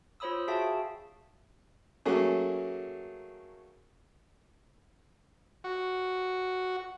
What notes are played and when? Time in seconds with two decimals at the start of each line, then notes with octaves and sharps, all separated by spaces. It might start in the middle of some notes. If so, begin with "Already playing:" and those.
0.20 F4 C5 C#5 B5 D#6 E6
0.48 F#4 G#4 E5 F5 G5 A5
2.06 F#3 A3 A#3 C#4 G#4
5.64 F#4